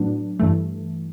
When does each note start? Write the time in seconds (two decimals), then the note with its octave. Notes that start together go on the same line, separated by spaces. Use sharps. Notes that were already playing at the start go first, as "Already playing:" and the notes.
Already playing: A2 F#3 B3 D4
0.39 G2 E3 A3